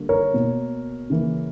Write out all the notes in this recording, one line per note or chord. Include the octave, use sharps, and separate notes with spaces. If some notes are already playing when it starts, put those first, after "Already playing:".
Already playing: D3 G3 A#3
A#4 C#5
B2 A#3
C#3 E3 A#3